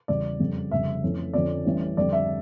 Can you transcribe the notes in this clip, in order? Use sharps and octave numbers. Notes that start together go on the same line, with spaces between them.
E2 C#3 G3 D5
F2 C#3 G3
F1 F2 C#3 G3 E5
F2 E3 A3 C#4
F2 D3 F3 C#4 D5
A1 A2 E3 G3 C#4
F2 D3 G3 D5
E5